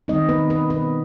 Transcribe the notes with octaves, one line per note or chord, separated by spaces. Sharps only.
D#3 G3 C4 D#4 D#5
B3 B4
B3 B4
B3 B4